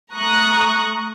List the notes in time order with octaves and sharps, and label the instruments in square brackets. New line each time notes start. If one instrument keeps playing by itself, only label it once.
[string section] A3 A#5 C#6 D#6 F#6